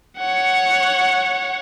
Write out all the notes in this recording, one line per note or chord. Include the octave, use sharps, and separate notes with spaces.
C#5 F#5